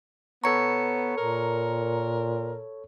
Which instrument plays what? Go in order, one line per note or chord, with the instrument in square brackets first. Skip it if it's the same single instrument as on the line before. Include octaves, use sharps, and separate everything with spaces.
[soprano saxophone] B3 [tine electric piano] A4 C#5 C#6 [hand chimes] A#5 C#7
[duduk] A#2 [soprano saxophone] A#4